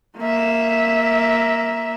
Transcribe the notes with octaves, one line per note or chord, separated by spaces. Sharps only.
A#3 E5